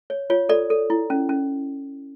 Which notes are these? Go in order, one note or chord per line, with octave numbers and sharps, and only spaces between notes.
C#5
F4 C#5
A4 D5
A4
E4
C#4
C#4